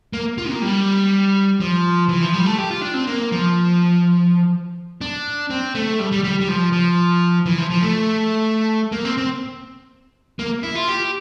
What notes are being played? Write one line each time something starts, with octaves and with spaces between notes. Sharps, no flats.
A#3
F4
A#3
G3
F3
E3
F3
G3
A3
G4
F4
D4
C4
A#3
F3
D4
C4
A3
G3
G3
G3
G3
F3
F3
E3
F3
F3
A3
A#3
C4
C4
A#3
E4
F4
G4